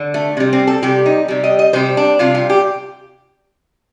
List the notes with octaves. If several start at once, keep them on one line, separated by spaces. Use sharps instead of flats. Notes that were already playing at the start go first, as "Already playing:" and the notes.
Already playing: D3
A3
C3 G3
C4
A4
C3 G3 G4
D#4
C3 G3
D#5
D#5
C3 G3 C5
D4
C3 G3 F4
F4
G4